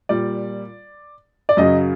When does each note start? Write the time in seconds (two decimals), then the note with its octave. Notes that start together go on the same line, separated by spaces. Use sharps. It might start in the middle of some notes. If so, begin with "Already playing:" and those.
0.09 A#2 G3 D5
1.49 D5
1.57 F#2 C#3 F#3 D#5